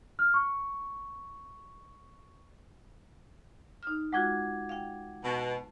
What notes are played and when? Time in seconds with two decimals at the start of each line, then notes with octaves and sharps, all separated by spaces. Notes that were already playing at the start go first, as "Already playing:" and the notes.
0.19 F6
0.34 C#6
3.83 D#4 F6
4.12 G#3 F4 F#4 F#5 D6 G#6
4.69 F5 G5
5.23 B2 A5